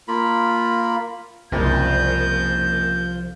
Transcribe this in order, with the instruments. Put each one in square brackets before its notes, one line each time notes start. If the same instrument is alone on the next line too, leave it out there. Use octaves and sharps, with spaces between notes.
[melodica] A#3 F4 B5
[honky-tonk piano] F#1 [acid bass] C2 [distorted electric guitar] F3 [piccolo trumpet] G6